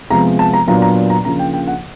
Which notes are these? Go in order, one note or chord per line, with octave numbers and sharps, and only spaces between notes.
C3 F3 G#3 B3 A#5
A5
A#5
A#2 F#3 B3 D4 F4 A#5
A#5
A#5
C#3 F3 A#3 D4 F4 A#5
G5
G5
F#5